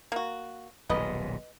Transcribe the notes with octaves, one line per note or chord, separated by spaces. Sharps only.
A#3 F#4
D#1 B1 G#2 B4 D#5